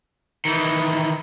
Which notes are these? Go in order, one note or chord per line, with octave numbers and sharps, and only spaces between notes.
D#3 E3